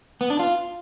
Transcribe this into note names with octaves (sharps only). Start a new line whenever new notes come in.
B3
D4
F4